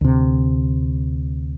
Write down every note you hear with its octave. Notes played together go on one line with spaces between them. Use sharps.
D2 C3